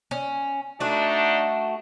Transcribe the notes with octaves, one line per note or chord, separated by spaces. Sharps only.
C#4
A3 D4 D#4 F#4